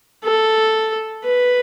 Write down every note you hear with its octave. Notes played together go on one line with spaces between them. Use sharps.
A4
B4